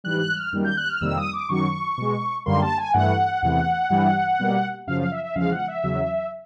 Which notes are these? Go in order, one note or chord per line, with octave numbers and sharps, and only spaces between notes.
G#2 E3 G3 F#6
F#6
F6
F#2 D#3 G3 A#3
G6
F#6
F6
F2 C3 D#3 G3 A#3 E6
D#6
D6
F#2 D#3 F#3 C#6
B2 G#3
F#2 D3 G3 A#3 C6
A5
G#5
G2 E3 A3 F#5
E2 C3 E3 A3
G2 E3 G3
B2 G3 A#3
F#2 C#3 F3 F5
F5
E5
E5
E2 C#3 F3 G#3 F5
F#5
E5
E2 C#3 F#3